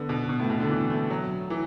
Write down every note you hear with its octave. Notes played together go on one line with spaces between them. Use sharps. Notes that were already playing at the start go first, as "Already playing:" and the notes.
Already playing: D3 B3
B2
B2
A2
B2
D3
E3
A3
F#3
E3